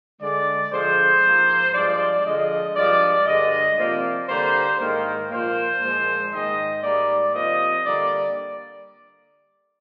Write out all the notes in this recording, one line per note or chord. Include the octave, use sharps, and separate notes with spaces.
D3 G#3 D5
D3 F3 G#3 C5
G#2 F3 A#3
G2 F3 G#3 D5
D3 F3 G#3 D#5
G2 F3 G#3 D5
G2 D3 G#3 D#5
C3 F3 A#3 D5
D3 G3 A#3 C5
G#2 D#3 A#3 A#4
A#2 F3 A#3 C5
A#2 F3 G#3
G#2 D#3 G#3 D#5
G#2 G3 A#3 D5
C3 F3 A#3 D#5
D3 G3 A#3 D5